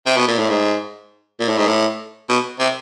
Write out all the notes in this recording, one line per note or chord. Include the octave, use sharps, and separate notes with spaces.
C3
B2
A#2
A2
G#2
A#2
A2
G#2
A2
B2
C3